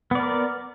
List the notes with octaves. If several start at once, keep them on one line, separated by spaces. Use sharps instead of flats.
B3 A#4 D5